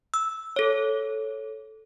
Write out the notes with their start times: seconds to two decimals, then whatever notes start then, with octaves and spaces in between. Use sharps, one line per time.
0.14 E6
0.56 A4 C#5